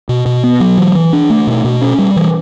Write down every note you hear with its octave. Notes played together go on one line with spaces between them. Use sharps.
B2
B2
B3
F#3
E3
E3
D4
A3
B2
B2
C#4
G3
E3